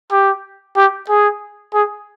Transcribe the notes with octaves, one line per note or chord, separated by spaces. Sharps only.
G4
G4
G#4
G#4